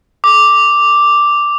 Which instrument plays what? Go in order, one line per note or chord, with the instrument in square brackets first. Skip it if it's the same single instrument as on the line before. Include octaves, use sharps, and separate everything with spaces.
[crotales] D6